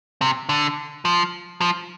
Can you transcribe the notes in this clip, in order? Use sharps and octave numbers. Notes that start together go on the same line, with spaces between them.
C3
D3
F3
F3